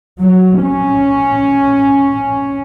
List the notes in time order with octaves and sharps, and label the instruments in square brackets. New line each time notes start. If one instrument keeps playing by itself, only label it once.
[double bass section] F#3
C#4